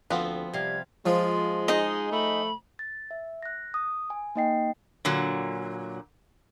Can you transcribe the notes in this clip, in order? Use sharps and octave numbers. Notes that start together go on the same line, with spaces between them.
D2 F3 B3 C4 F4 B4
C3 G3 F5 G#6
F3 G#3 F4
D#4 G#4 D#5
A3 B5
A6
E5
F#6 A#6
D#6
G#5
A#3 D#4 D#5 G5 C7
A#2 D3 F#3